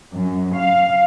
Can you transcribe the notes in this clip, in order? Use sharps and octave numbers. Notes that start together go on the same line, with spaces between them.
F#2
F5